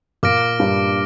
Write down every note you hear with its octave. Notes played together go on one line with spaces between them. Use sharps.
A#2 A#3 D6 F6 A#6 D7
G2 G3